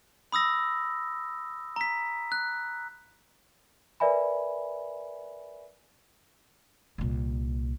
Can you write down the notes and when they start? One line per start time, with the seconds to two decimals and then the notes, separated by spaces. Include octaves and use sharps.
0.32 B5 D#6 E6 A#6
1.76 A#5 B6
2.32 F#6
4.00 A#4 B4 D5 E5 G#5 B5
6.98 C2 A#2